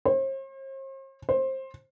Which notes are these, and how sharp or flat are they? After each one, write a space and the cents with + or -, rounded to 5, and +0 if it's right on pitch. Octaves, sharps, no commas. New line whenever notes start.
C5 +45
C5 +20